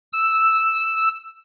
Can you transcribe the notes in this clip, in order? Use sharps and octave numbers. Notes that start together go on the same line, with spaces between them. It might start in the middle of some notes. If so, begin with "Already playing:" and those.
E6